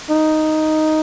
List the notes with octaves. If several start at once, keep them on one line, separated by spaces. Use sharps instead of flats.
D#4